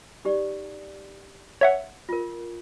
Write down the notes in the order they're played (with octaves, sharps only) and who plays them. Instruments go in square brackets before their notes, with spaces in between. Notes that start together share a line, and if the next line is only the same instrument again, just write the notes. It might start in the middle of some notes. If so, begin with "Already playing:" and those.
[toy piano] D#4 G4 D5
[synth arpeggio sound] C#5 E5 F#5
[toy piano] F4 A#4